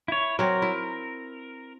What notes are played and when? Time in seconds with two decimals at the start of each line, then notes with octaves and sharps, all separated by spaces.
0.08 E4 C#5
0.39 F#3 C4 A#4
0.62 E4